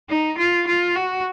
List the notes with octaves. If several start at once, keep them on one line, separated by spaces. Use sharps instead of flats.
D#4
F4
F4
F#4